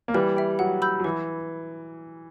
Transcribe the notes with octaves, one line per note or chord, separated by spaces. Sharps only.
A#3
E3 G3 B4
E5 G5
F#3 F#5
B5 E6 G6
F#3
E3 B4